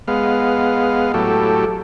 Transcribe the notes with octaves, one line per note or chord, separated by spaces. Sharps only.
G#3 B3 F5
A2 F#3 G4 A4